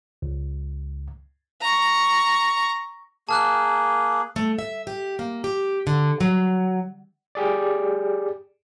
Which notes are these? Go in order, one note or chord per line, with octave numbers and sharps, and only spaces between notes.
C#2
A#5 C#6
A#3 G#4 A5 F6 F#6
A3
E5
G4
A#3
G4
D3
F#3
G4 G#4 D5